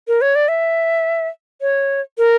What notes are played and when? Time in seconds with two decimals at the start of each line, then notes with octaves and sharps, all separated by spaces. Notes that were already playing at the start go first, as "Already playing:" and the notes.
0.08 A#4
0.21 C#5
0.35 D5
0.48 E5
1.61 C#5
2.18 A#4